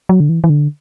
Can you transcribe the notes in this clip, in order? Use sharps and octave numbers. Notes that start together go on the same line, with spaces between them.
F#3
D3
E3
E3
D3